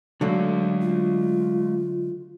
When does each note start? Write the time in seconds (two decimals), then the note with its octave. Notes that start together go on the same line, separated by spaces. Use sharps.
0.21 D3 F#3 G#3 A3 F5
0.82 F4